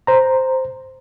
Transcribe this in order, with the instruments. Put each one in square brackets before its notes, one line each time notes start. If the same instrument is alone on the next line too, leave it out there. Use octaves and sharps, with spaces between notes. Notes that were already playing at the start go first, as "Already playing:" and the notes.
[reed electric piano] C5 A#5